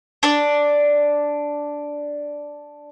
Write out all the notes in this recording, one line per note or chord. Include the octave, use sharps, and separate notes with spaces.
D4 D5